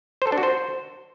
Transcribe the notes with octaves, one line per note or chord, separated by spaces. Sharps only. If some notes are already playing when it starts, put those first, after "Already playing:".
C5
A4
D4
F#4
C5